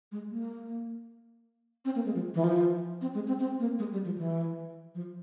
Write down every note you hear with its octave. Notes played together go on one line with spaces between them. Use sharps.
G#3
A#3
C4
A#3
G#3
F3
E3
F3
C4
G#3
C4
C4
A#3
G#3
G3
F3
E3
F3